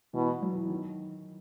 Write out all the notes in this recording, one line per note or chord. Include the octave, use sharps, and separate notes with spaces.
B2 E3
E3
F#3
E3
D#3